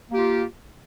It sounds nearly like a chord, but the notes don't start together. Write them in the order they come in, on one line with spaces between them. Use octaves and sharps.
A#3 G4 F4